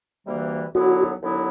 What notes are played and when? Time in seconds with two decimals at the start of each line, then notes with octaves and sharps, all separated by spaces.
0.26 D2 C3 E3 G3 A#3
0.74 D#2 D3 F#3 B3 E4 F#4
1.23 D#2 D3 F#3 B3 E4